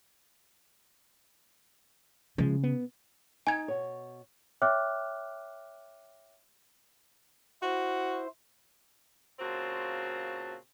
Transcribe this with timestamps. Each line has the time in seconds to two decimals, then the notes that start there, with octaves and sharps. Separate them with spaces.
2.38 C#3 F3 G#3
2.63 B3
3.47 D#4 G#5 G#6
3.68 B2 C#5
4.62 C#5 E5 G5 D6 F6 F#6
7.62 E4 F#4 C5
9.40 A#2 C#3 C4 F#4 A5